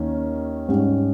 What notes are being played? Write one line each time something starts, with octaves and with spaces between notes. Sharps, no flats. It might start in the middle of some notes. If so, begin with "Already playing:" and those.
Already playing: D#2 D#3 A#3 C#4
G#2 G3 C#4 G4